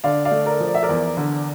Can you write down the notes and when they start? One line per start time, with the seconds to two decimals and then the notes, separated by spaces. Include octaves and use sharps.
0.04 D3 D5 F5
0.25 D5 F5
0.31 A3
0.46 A#4 D5
0.60 F3
0.67 D5
0.74 E5
0.83 A#4 D5
0.89 E2
1.17 D3